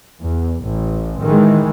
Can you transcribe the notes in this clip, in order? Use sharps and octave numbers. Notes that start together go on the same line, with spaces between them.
E2
A1
D#3 E3 G#3